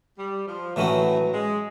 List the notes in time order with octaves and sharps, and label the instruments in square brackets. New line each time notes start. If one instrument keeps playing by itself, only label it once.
[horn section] G3
F3
[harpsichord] A2 E3 A3 C#4 F#4 [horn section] F#3
[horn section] F#3
G#3